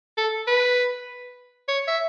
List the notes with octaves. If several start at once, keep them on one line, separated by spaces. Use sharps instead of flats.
A4
B4
C#5
E5